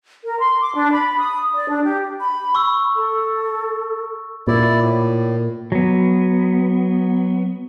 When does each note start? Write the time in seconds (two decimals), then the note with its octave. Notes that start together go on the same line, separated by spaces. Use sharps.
0.24 A#4
0.40 C6
0.60 D6
0.74 D4
0.91 B5
1.19 D#6
1.55 D5
1.70 D4
1.84 G4
2.20 B5
2.55 C#6 E6
2.96 A4
4.47 A#2 E4 D5
4.81 A2
5.72 F#3 B3